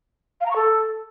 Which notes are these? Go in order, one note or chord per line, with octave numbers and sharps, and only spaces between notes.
F5
A#5
C#6
A4